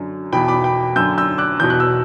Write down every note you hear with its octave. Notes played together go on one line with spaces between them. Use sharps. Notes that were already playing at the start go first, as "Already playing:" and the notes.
Already playing: F#2 D3
E2 B2 G5 B5
B5 D6
G5 B5
F#2 D3 E6 G6
E6 G6
D6 F#6
E2 B2 G6
F#6
E6